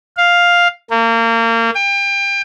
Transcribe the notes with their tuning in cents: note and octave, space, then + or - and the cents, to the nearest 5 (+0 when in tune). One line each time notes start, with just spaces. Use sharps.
F5 +5
A#3 -30
G5 +30